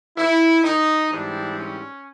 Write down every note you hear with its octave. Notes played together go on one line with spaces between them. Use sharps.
E4
D#4
G#2 E3 G3 C4 D4
C#4